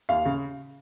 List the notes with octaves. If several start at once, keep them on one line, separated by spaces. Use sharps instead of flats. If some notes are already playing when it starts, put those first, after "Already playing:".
D#2 F5
C#3